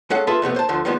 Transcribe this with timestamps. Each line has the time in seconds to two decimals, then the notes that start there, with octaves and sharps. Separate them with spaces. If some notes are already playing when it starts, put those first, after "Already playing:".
0.10 G#3 C#4 A4 F5 F#5
0.27 F4 G#4 A4 B4 E5 A5
0.42 F2 C3 A3 B3
0.56 C5 A5
0.69 D2 D3 F3 A3
0.85 D#3 F3 G3 G#3 B3